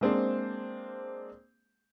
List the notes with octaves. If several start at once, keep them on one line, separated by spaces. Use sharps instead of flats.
G#3 A#3 C4 D4 G#4 C5